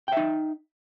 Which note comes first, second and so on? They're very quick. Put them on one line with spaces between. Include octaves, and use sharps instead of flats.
G5 E5 D#4